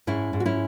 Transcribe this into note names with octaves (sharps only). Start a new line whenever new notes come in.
G#2 C#4 E4
G#2
F#4
C#4 E4